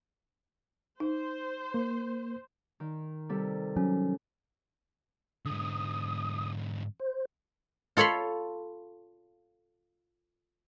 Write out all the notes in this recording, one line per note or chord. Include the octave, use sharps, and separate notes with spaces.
D#4 C5
A#3
D#3
C3 G3 A4
F#3 C#4
G#2 D3 D#6
C5
F4 A4 C#5 B5 C6